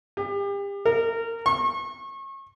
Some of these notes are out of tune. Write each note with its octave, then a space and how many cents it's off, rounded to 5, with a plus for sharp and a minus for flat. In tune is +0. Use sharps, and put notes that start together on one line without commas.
G4 +35
A#4 -20
C#6 -35